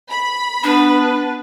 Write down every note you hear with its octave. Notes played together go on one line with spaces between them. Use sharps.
B5
B3 D4 B4